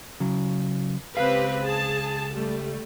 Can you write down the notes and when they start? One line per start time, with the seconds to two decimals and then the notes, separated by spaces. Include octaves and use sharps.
0.20 C#3 F#3
1.17 C#2 C4 G4 B4 F5
1.62 G#4 A5
2.32 G3 A3